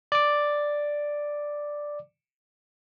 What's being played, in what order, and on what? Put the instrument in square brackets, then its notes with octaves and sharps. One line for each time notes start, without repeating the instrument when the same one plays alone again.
[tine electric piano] D5 D6